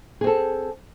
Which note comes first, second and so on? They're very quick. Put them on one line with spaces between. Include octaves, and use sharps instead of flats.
G#4 C4 A4